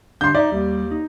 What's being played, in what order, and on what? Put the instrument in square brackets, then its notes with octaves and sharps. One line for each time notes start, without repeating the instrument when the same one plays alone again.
[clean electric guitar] D3 D4 G4 [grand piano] C6 G6
[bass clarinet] D#4 [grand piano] D5 [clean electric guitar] E5
[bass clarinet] D#2 [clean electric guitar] G3
[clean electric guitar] D#4